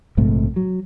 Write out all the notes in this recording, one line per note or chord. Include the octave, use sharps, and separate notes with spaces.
A#1 G#2 C3 A3
F#3